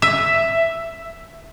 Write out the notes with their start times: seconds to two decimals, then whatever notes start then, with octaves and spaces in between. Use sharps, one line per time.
0.02 E5